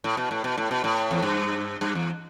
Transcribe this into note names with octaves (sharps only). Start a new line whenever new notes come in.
A2
B2
A2
B2
A2
B2
A2
E2
G2
G2
E2